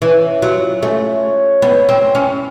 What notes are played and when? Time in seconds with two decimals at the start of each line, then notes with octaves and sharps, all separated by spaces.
0.02 E3 C#4
0.42 F#3 F4
0.82 A3 C#4
1.23 C#5
1.62 B3 E4
1.89 C4
2.02 C5
2.15 C#4